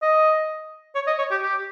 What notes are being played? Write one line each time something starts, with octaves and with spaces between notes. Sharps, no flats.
D#5
C#5
D#5
C#5
G4
G4